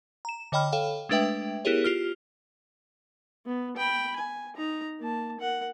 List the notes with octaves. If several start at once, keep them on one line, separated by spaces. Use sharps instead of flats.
A#5 E7
D3 C#5 D#5 G5 B5 F6
A4 C#5 F5 G5
G#3 A3 D4 B4 E5 G5
B3 E4 G4 G#4 A#4 C#5
F4 G4 F6
B3
G5 B5
G#5
D#4 A#5
A#3 A5
A#4 F#5